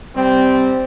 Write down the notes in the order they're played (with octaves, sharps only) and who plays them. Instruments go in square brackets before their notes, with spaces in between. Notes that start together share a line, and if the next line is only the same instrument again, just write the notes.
[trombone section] C3 G3 C4